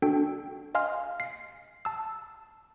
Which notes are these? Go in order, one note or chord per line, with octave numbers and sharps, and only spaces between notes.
D4 F#4 A4 G5
D#5 F5 G#5 C6 F6
C7
A5 E6